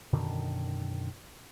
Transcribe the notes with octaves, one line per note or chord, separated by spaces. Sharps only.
F#2 B2 D3 D#3